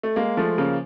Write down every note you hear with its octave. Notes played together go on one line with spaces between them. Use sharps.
A3
G#3 A#3
F3 A3
C#3 A#3